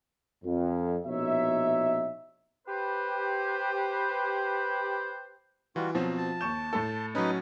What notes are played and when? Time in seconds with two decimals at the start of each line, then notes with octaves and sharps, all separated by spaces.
0.44 F2
1.07 A#1 B2 D#4 C#5 E5
2.67 G4 B4 C5
5.76 E3 G3 F4 F#4
5.95 B2 F3 F#3 C4
6.18 A5
6.41 D#2 C#6 G6 E7
6.73 A2 A4
7.15 F#3 C#4 D#4 B4